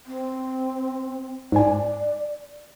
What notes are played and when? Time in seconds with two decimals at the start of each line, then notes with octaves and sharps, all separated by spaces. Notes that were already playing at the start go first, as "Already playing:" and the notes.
0.07 C4
1.52 G#2 D5 G#5